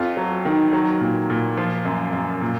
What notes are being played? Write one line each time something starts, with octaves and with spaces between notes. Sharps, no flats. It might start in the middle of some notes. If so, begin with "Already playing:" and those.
Already playing: F2 F4
F#3
D#3
F#3
A#2
A#2
F3 F4
F#2
F#2
A#2